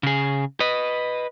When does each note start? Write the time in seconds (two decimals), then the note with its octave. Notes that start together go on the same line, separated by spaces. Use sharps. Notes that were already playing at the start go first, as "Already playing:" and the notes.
0.03 C#3 G#4
0.60 B4 D#5